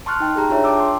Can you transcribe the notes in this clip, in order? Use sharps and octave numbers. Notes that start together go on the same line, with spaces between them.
A5 C6 C#6 F6 F#6
D#4 G5
G4 G#4 G5 A#5
D4 F4 G#4 C#5 E5
G5 A5 D6 E6
C6